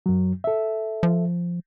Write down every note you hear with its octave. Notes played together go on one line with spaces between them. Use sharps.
F#2 F#3
A4 E5
F3